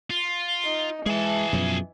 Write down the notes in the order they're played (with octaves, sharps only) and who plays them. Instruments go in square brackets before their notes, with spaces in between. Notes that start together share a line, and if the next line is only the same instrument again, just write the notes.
[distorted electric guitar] F4
[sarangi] D#4
[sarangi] E3 [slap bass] G#3 [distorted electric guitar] G#4 A5
[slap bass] F#2 B2 F3